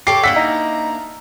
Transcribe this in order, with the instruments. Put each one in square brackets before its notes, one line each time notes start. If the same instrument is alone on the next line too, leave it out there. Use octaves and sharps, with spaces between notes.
[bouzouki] G4 A4 C#5 [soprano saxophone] D6 [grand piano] C7
[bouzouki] A#3 D4 E4 [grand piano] F#5 E6 B6
[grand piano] D#4 [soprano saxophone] A#5